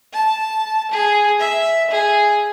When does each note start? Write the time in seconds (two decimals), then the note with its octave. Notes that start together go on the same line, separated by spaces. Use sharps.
0.13 A5
0.92 G#4
1.40 E5
1.91 G#4